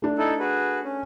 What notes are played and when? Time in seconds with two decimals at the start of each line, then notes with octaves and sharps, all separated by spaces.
0.02 A3 D4
0.18 D#4 E4 A4
0.39 F#4 G#4 B4
0.84 C#4